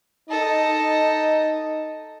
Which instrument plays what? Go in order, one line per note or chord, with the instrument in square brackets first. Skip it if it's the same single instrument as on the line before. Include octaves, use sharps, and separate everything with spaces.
[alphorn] D#4 [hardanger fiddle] A4 D#5